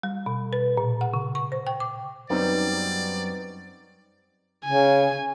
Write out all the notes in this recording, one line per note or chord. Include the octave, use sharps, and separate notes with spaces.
G3
B2
B4
A#2
F#5
C#3
C#6
C5
G5
D6
F#2 F#3 G3 B3 C4 D#4 D5
C#3 G#5